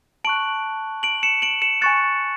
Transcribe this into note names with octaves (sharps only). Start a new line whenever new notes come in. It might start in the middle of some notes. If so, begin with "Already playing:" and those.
A5 C#6 F#6 D7 F#7
D7 F#7
C#7 E7
D7 F#7
C#7 E7
G#5 C#6 F#6 A6 C#7